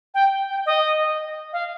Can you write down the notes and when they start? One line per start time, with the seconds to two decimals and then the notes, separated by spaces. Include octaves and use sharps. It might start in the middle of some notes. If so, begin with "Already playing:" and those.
0.14 G5
0.50 G5
0.66 D#5
1.53 F5